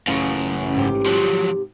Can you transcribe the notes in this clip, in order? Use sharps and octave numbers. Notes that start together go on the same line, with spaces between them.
A1 F#2 C#3 F4
G#2 C3 G4
F3 F#3